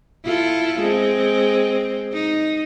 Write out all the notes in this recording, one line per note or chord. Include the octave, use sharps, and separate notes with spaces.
E4 F4 A4
G#3 C4
D#4